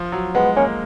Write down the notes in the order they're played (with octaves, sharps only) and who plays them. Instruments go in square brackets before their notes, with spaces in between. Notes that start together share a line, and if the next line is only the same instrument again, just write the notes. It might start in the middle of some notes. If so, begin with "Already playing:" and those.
Already playing: [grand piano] F3
F#3
[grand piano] G#3 [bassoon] B3
[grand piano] A#3 [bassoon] C#4